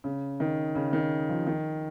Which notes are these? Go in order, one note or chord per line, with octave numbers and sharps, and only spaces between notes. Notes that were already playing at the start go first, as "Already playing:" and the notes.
C#3
D#3
C#3
D#3
F3
D#3